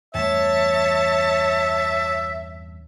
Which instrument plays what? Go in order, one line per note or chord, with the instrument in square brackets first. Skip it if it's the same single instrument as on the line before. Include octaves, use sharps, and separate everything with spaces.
[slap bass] E2 G2 A3 [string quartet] C#5 A5 [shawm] E5